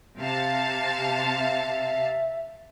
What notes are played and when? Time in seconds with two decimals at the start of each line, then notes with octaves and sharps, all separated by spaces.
0.20 C3 F5 A5
1.40 E5